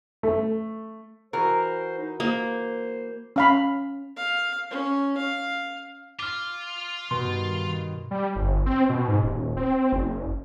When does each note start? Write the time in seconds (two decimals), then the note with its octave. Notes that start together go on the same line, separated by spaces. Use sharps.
0.23 A3
1.33 E3 F#4 A#4 C5
1.98 D#4
2.20 A#3 C5
3.36 C#4 F5 B5
4.16 F5
4.70 C#4
5.17 F5
6.19 F4 D6 F6 G7
7.11 G2 B2 D#3 C6
8.11 G3
8.36 G1
8.66 C4
8.89 B2
9.08 G#2
9.23 D#1
9.57 C4
9.93 F#1